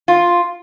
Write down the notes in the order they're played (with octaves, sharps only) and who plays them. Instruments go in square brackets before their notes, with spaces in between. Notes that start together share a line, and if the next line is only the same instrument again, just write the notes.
[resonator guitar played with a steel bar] F4